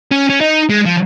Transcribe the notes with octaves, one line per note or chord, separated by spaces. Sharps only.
C#4
C#4
D#4
G#3
F3